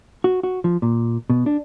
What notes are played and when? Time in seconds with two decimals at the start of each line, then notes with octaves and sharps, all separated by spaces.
0.24 F#4
0.43 F#4
0.64 F3
0.82 A#2
1.30 B2
1.46 D4